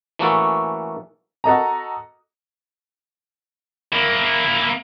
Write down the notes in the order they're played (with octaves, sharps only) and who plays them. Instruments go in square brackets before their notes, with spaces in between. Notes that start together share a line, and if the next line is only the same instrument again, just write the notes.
[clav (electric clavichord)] E3 A3 A#3 C#4 F#4 A4
[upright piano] F#4 A4 D#5 A#5
[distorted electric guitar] A#3 E4